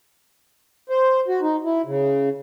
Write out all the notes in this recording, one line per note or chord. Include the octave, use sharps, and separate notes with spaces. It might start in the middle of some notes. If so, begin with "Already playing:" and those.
C5
F#4
D#4
E4
C#3